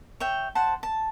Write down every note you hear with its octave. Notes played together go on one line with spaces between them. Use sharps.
C#5 E5 G5
C5 F#5 A5
A5